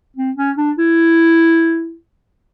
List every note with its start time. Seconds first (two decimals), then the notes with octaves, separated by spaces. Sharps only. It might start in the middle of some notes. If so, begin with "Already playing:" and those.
0.16 C4
0.37 C#4
0.58 D4
0.78 E4